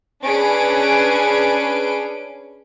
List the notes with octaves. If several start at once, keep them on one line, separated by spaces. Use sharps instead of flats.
C#4 D4 G#4 B4 D7